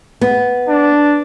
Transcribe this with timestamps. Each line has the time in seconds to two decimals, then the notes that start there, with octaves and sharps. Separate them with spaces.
0.21 B3
0.69 D4